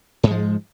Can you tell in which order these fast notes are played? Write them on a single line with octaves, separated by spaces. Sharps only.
G#2 G#3 F3